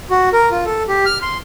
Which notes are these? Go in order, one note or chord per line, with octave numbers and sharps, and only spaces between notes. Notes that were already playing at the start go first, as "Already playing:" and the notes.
F#4
A#4
F4
A4
G4
F6
C6